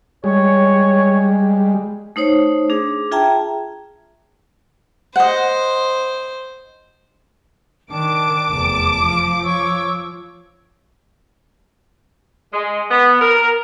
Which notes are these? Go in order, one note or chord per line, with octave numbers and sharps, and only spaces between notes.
G3 G#3 C#5
A3 D#4 C5 C#5
D4 G#4
F4 G#4 E5 G5 A5 A#5
C5 D#5 F#5
D#3 D4 A5 D6 D7
F1 E2 A5
F3
C#5 C#6 E6
G#3
B3
A#4